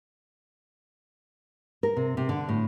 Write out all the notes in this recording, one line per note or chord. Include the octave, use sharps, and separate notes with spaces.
A#4
C3
C3
D3
A2